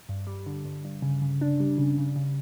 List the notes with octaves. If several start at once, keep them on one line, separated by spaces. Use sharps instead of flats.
G2
G3
D3
G2
G2
C#3
C#3
D4
G3
C#3
C#3
C#3